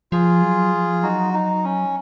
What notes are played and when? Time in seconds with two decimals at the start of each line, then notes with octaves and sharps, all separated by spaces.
0.12 F3 F4 G#4
0.42 F#3
0.73 F3
1.03 F#3 D#4 F#4
1.34 D#4
1.64 C#4